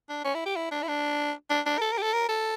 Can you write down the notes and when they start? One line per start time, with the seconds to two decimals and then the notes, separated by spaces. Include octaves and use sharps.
0.09 D4
0.25 C#4
0.35 E4
0.46 G4
0.56 E4
0.71 D4
0.83 E4
0.88 D4
1.50 D4
1.66 D4
1.78 A#4
1.82 A4
1.92 A#4
1.98 G4
2.02 A4
2.13 A#4
2.29 A4